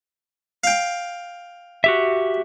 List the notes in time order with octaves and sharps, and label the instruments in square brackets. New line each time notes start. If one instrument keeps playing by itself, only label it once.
[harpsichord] F5 G5
[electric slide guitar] F#4 G4 E5